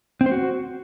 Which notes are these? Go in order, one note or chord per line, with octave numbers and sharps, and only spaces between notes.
C4
C5
F#4